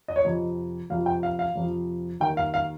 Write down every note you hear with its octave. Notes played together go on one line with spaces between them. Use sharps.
D#5
C#5
F2 C3 F3 D#5
F2 C3 F3 F5
G5
F5
F5
F2 C3 F3
D#2 D#3 G5
F5
F5